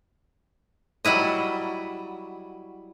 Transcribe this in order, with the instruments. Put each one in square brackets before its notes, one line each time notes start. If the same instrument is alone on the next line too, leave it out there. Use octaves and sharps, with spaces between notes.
[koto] F#3 G3 E4 D#5